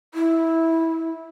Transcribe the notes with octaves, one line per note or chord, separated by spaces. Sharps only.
E4